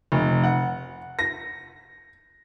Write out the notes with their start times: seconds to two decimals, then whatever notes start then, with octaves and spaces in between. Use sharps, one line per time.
0.12 F1
0.44 F#5
1.19 A#6